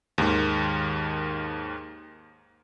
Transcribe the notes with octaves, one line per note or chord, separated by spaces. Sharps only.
D#2 G#2 D#3